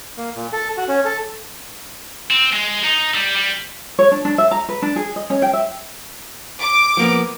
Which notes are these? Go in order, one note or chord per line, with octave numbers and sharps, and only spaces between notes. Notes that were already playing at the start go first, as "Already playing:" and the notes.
A#3
A#2
A4
F#4
C#4
A4
C4
G#3
D#4
G3
G3
C#5
D4
D4
E5
A#5
B4
D4
G#4
D#5
C#4
G5
E5
D6
F3 A#3 B3